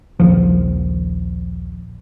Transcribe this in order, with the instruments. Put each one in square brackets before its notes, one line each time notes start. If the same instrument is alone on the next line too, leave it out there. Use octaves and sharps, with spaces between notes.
[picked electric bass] A#1 D#2 F3